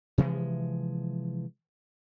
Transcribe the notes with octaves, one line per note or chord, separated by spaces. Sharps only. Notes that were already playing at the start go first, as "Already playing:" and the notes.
C3 E3 F3 G#3